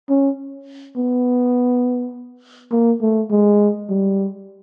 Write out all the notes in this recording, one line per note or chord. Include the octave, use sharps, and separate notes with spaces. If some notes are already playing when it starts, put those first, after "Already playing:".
C#4
B3
A#3
A3
G#3
G3